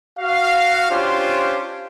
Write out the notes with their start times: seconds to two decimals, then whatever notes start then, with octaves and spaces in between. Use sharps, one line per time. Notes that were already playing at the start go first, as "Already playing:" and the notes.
0.19 F#4 F5
0.90 C#4 D4 F4 G4 C5